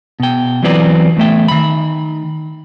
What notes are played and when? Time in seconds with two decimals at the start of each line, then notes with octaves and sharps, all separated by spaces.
0.20 B2 G5
0.63 E2 E3 F#3 C4 B4 D5
1.17 E2 A3 E5 G5
1.48 D#3 B5